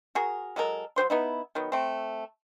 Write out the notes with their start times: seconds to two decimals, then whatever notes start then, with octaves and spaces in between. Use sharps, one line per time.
0.15 F#4 G#4 A#4
0.56 F#3 G#3 A4 A#4
0.96 F#3 F#4 C5 C6
1.10 B3 D#4 E4
1.55 D#3 F#3 B3
1.72 A3 C4